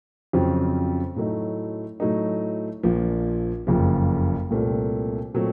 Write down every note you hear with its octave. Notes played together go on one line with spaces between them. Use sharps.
F2 C#3 F#3 C4 F4
A2 F#3 A3 D#4
A2 F#3 A3 D#4
A#1 A#2 F3
F#1 F2 C#3 F3
C2 A#2 A3 C4
A#2 F#3 A3 C4